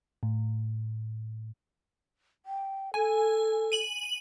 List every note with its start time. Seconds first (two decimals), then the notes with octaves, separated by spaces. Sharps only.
0.23 A2
2.46 G5
2.94 A4 G#5
3.72 D#7 F#7